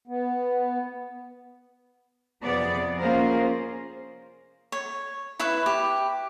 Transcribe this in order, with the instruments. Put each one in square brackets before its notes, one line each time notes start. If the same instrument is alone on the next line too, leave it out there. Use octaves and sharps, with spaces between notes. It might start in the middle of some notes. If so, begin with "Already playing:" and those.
[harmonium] B3
[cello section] F2 C3 B3 G#4 D5
A#3 C#4 F4 G#4 A#4 C5
[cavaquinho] C#5
E4 B4 E5 C#6
G4